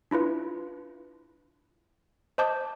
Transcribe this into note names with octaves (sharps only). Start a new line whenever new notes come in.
D4 E4 F4 B4
C5 D#5 A5 D6 G6